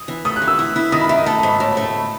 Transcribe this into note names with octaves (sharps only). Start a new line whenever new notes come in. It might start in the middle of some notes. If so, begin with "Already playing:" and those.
Already playing: D#6
E3
A3 D#6
F#6
E3
E6
E4
E4
D#3 D#6
B5
D#3 E5
D#5
A3 A5
A5
G#2
B5
A2 A5
B5
A3
A5